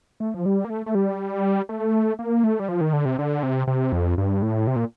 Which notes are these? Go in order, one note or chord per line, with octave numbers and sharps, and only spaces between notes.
A3
F3
G3
A#3
A3
A3
G3
A3
A#3
A3
G3
F3
D#3
D3
C3
D3
C3
C3
F2
G2
A2
C3
A#2